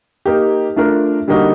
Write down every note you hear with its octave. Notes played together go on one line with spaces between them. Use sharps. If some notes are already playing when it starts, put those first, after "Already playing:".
A#3 D#4 G4
A3 D4 F4 A#4
D3 G3 A#3 D#4 F#4